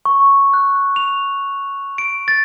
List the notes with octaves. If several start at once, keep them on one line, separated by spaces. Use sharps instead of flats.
C#6
F#6
F7
D7
A6